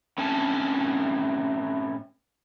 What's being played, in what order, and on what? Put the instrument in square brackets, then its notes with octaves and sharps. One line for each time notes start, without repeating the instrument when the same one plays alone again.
[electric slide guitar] A2 C4 C#4 G#5 A5